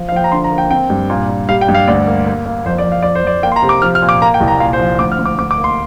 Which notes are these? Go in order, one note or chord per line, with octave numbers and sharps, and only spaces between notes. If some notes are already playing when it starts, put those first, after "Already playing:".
Already playing: F3
F5
F3 G5
A#5
D3 C6
A#5
A#3
G5
C4 G5
G2
A#2
A#2
G3 F5
G5
G2
F5
D2 D5
A#3
A#3
A#3
F2 C5
D5
F2
F5
F2 D5
C5
F2 D5
A#3 G5
C6
A#5
C3
D6
F3 F6
F6
A#2
D6
A#3 A#5
G5
C2
A#5
A#2 F5
C5
F3
D2 D6
F6
D2
D6
D2 D6
D6
A#3
C6